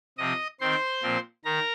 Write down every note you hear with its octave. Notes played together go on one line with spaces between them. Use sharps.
C3 F3 C4 D#5 D#6
D#3 C4 C5 C6
A#2 F3 C4
D#3 A#4 A#5